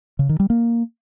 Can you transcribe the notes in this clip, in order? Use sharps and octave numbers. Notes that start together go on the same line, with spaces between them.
C#3
D#3
G3
A#3